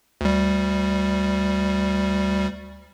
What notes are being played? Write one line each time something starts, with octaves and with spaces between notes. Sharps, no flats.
D2 G3